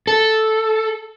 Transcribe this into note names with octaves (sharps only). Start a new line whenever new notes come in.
A4